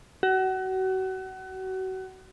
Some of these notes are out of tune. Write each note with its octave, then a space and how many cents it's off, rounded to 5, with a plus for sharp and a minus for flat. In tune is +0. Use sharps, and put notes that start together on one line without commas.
F#4 +30